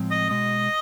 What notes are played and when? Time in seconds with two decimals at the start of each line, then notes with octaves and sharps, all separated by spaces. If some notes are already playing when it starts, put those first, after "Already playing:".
Already playing: A2 F3 G#3 C4
0.11 D#5
0.30 B2 G#3 D#5